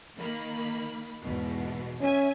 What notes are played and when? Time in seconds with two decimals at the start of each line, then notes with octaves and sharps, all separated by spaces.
0.17 D#3 A#3 B5
1.23 E2 G#2 B2
2.01 C#4 E5 G#5